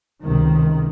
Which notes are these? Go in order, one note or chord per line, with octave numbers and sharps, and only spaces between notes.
C#2 C3 D#3